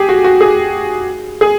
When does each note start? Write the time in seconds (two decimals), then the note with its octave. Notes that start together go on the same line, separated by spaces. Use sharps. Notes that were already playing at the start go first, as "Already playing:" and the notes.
Already playing: G4 G#4
0.09 F#4
0.24 F#4
0.41 G#4
1.41 G#4